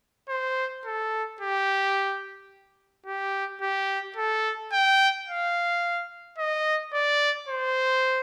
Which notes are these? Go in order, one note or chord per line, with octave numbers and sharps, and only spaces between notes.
C5
A4
G4
G4
G4
A4
G5
F5
D#5
D5
C5